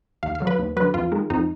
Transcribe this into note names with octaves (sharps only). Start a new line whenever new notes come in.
D#2 F5
F5
D3 F#3
B4
D#2
D3 F#3 B4
F2 F4
D#3 G#3
F2 D#4